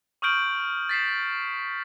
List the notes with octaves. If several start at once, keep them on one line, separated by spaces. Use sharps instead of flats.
C#6 D#6 F6 G6 D7 F#7
A6 B6 C7 E7